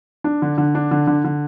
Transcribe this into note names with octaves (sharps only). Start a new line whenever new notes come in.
D4
D3
D3
D4
D3
D3
D3